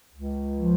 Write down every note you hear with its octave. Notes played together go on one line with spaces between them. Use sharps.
C#2
F3